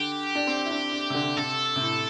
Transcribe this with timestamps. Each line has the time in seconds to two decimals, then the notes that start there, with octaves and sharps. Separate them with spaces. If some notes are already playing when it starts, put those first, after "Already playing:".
Already playing: D3 G4
0.35 D4
0.47 C4
0.66 E4
0.71 D4
0.92 D4
1.10 C3
1.14 D3
1.37 C3 A4
1.76 C3
1.81 A2